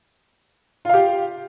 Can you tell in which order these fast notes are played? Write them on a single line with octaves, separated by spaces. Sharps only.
F4 F5 G4